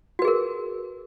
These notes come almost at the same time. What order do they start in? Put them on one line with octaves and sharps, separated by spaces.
F#4 B4 G#4 A#4